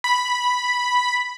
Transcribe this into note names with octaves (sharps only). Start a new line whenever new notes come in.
B5